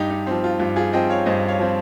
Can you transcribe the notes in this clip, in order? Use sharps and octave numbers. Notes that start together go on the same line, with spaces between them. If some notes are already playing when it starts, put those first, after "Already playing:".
Already playing: G2 D#4 G4
D#4
F3 C4
F4
G2 F4
F4 G#4
F3 C4 D#5 G5
C#5 F5
G2 C5 D#5
C#5 F5
F3 C4